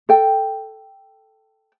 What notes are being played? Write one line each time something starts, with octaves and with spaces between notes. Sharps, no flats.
A4 G5